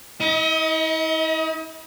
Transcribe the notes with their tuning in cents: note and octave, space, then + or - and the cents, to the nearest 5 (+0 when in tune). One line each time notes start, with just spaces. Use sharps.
E4 -40 D#5 +30